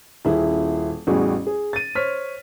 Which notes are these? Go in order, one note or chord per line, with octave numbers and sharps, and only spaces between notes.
D#1 E4 G#4
A1 E2 G3 F#4 G#4
G#4
A6 D#7
C5 C#5 F6 B6